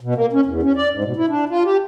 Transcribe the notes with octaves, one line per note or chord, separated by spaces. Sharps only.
B2
A#3
C#4
E2
C#4
D5
G#2
B2
E4
D4
F4
G4